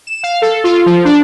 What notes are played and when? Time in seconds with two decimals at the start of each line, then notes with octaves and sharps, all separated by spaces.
0.07 E7
0.23 F5
0.42 A4
0.64 F4
0.86 F3
1.05 D4